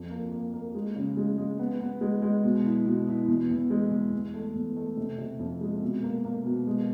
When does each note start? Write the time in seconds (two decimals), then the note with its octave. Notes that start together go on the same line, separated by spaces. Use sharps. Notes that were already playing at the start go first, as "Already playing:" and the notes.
Already playing: F2
0.11 A#3
0.32 A#3
0.54 A#3
0.75 G#3
0.96 C#3
1.17 G#3
1.38 G#3
1.59 B3
1.80 B3
2.01 G#3
2.22 G#3
2.44 B2
2.65 E4
2.86 B2
3.07 E4
3.28 E2
3.50 E2
3.70 G#3
3.91 E2
4.12 E2
4.34 A3
4.55 E2
4.76 A3
4.97 C3
5.18 C3
5.39 F2
5.61 G#3
5.82 B2
6.03 A#3
6.25 A#3
6.45 B2
6.67 G#3